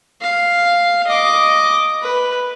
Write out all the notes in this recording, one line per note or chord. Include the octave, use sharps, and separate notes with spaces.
F5
D#5 D6
B4